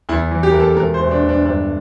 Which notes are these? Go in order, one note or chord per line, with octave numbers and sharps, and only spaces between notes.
E2 E4
E3
G4
E2 A#4
A4
E1 A#4
C5
E1
D4
E1
D4
G1 D4